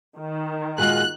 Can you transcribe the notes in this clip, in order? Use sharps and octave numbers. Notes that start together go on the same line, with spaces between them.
D#3
A#2 G#3 F4 F#4 G#4 F#6